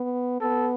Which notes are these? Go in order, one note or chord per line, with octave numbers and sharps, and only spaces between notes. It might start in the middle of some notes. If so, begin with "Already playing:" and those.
Already playing: B3
B3 A4